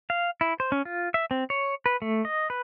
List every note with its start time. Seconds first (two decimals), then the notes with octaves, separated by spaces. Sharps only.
0.10 F5
0.41 E4
0.60 C5
0.72 C#4
0.85 F4
1.14 E5
1.31 C4
1.50 C#5
1.86 B4
2.02 A3
2.25 D#5
2.50 B4